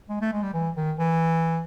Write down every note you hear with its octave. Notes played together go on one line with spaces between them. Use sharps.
G#3
A3
G#3
G3
E3
D#3
E3